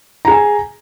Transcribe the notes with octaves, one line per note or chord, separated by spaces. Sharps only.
G#4 G#5 A#5